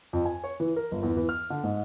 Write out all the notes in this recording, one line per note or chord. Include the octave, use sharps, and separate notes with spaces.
F2
G#5
C#5
E3
A#4
G1
E2
E3
F6
D3
G#2